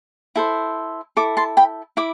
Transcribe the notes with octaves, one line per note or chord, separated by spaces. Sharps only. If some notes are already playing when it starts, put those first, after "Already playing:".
E4 A4 C5
E4 A4 D6
A5 C6
G5 B5
E4 B5 D6